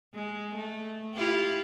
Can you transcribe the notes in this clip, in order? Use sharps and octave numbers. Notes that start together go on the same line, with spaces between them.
G#3
A3
E4 F4 G4